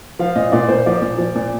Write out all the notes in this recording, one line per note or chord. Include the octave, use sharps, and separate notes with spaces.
F3 F5
A#2 D#5
A#2 D5
A#2 C5
F3 D5
A#2
F3
A#2